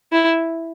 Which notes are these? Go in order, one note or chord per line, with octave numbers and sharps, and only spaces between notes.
E4